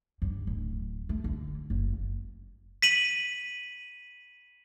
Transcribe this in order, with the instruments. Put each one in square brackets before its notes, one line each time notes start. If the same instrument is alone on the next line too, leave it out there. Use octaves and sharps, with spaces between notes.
[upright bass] G2
D1
A3
D3
F#1
[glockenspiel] B6 D#7 F#7